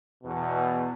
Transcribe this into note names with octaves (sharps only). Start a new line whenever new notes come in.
E2 B2